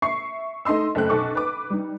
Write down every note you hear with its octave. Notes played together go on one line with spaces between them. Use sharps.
E5 C#6 C7
A3 D#4 D#5 C6 E6
F#1 A3 G5 F#6
B1 A4 C#6 D6
B4 D6
G3 D#4